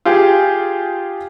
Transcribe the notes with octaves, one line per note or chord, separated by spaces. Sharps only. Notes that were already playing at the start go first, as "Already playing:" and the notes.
F4 G4 G#4